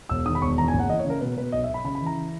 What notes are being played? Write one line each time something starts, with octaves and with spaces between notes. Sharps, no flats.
E1 E6
D#3 D#6
B5
E1 C#6
E2 A#5
G#5
F#1
F#5
E3 D#5
C#5
C#3
A#4
B2 B4
B2 B4
B1 D#5
E5
B1
B5
C#3 B5
B5
E3
A#5